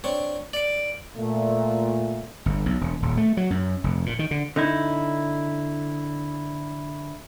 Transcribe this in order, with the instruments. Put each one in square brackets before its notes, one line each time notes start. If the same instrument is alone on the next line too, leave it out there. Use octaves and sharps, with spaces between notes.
[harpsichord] C4 D4 C#5
[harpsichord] D5 [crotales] D7 F#7
[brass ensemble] A#2 A3
[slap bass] G1
B1
E1
D#1
A3
F#3
F#2
F1
A#2
D#3
D3
[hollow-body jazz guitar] D3 D#4 E4